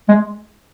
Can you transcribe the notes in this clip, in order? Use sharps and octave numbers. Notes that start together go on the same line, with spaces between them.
G#3